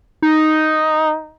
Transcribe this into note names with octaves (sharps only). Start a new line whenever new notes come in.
D#4